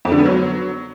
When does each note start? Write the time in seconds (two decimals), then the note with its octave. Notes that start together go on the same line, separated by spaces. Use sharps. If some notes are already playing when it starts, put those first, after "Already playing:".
0.05 F2
0.12 D3
0.19 B3
0.26 F#3